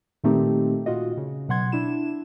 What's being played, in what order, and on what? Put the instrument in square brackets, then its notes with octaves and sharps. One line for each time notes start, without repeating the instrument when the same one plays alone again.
[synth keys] A#2 D#3 A3 C4 D#4 G4
A#2 F4 F#4 D#5
C#3
B2 F#3 F#5 C6 G#6
D4 E4 E7